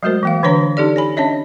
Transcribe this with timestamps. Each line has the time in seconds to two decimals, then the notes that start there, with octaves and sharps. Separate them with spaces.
0.03 F#3 G#3 A3 F#4 A#4 C5
0.23 E3 A#3 F5
0.43 D3 E3 D4 B4 C#5 A#5
0.77 C#4 D#4 G4 A4 D5
0.96 C#5 G#5 B5
1.17 C#4 D4 C#5 D#5 E5